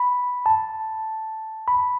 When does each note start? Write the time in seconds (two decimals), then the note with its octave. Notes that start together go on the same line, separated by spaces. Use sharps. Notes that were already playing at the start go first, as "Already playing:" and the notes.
Already playing: B5
0.46 A5
1.68 B5